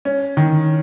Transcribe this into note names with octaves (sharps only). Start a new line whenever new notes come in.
C#4
D#3